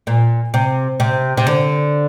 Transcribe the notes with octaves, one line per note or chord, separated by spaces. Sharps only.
A#2
C3
C3
C3
D3